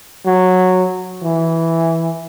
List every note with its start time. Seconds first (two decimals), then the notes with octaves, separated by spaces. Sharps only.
0.26 F#3
1.23 E3